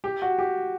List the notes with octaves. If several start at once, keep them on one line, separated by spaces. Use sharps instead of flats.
G4
F#4
G4